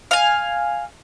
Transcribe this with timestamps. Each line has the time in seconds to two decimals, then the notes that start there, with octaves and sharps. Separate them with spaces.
0.11 F5 G#5